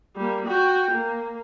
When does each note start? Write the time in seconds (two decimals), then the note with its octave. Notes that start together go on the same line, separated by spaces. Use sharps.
0.16 G3 A#3
0.47 F#4 G5
0.92 A#3